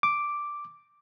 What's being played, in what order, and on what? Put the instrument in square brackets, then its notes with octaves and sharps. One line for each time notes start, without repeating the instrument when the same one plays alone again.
[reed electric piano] D6